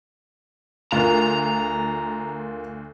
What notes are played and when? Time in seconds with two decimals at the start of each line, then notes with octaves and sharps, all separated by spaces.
0.92 D2 F4 A#4 A#5